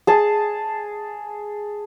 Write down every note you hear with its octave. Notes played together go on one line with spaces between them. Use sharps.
G#4 A5